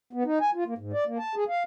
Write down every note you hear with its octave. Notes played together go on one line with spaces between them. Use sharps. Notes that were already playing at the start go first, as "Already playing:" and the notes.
B3
D#4
G#5
F4
A#3
G#2
D5
A#3
A5
G#4
F5